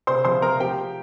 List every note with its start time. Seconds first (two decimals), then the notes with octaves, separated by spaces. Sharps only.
0.07 C3 C5 C6
0.25 F3 C5 C6
0.42 F3 A#4 A#5
0.60 F3 G4 G5